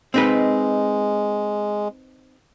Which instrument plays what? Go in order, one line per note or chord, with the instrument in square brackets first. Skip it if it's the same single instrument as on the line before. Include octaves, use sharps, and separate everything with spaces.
[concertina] G#3 [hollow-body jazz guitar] C4 D#4 B4